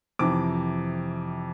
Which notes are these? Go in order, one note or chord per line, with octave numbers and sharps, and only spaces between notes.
F2 C3 E3 D6